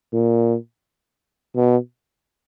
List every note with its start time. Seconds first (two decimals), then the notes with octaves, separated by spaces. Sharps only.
0.13 A#2
1.55 B2